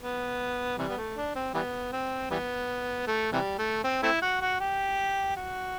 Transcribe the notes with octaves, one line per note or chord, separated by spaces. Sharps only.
B3
C3 E3 G3
B3
A3
D4
C4
E3 G3 B3
C4
E3 G3 B3
A3
C3 E3 G3
A3
C4
A3 C4 E4
F#4
F#4
G4
F#4